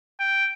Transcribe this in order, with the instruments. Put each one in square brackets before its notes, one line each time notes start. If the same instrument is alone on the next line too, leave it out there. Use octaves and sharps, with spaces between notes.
[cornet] G5